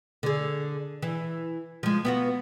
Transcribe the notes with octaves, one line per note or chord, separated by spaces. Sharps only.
D3 G#4
E3
F3 G#3
B3 F4 F#4